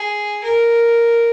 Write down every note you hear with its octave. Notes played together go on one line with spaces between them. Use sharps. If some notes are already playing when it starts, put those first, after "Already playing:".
Already playing: G#4
A#4